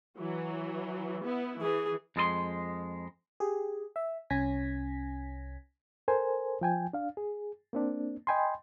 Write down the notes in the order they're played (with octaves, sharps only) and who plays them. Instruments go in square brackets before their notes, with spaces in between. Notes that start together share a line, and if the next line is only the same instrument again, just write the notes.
[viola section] E3 F#3
B3 E4
[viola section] E3 [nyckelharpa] G#4
[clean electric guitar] F2 G#3 A4 C6
[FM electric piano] G4 G#4
E5
C2 C#4 G#5 G#6 A#6 B6
[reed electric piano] A4 A#4 C5 G#5
F3 G5 G#5
D4 F5
G#4
A#3 C4 D4
D#5 G5 G#5 B5 C6